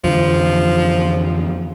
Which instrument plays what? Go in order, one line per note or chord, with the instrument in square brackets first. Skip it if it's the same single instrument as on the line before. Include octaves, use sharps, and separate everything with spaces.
[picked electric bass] F2 D3 E3 [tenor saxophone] F3